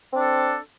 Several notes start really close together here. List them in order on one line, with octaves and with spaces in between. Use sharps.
C4 D4 A4